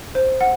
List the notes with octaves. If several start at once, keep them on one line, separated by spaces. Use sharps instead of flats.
C5
F#5